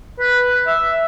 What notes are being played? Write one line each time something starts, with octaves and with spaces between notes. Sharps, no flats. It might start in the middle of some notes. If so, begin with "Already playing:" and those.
B4
E5